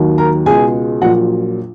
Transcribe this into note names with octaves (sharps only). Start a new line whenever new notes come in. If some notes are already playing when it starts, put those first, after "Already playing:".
Already playing: D#2 D#3 F#3
A#4 A#5
C#2 B2 G#3 G#4 G#5
A#1 A#2 F#3 F#4 F#5